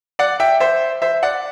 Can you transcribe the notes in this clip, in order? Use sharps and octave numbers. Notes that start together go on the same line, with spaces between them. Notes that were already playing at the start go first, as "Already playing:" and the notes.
D5 F#5
E5 G5
C5 E5
C5 E5
D5 F#5